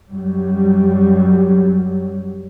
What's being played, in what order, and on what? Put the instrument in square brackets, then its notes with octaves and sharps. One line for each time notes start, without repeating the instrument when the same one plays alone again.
[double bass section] F#2 F#3 G3